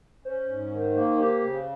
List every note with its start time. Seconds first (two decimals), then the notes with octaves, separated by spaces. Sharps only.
0.24 C#4 C5
0.48 G#2
0.71 D#3
0.94 A#3
1.17 G4 C5
1.41 C#3